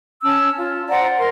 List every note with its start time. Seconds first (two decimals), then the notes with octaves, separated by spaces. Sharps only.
0.22 C#4 A5 E6
0.57 F4
0.89 C5 D5 F#5 A#5
1.17 A#4 C6